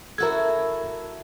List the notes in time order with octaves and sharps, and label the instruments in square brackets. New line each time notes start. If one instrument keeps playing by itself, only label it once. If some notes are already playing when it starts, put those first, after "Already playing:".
[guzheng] E4 F#4 A4 [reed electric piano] A#4 G#6